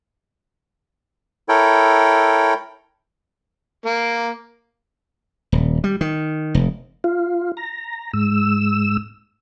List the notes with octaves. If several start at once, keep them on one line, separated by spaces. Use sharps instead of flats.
E4 A4 A#4 C#5 G5
A#3
D#1
G3
D#3
F1
F4
A#5
G#2 E6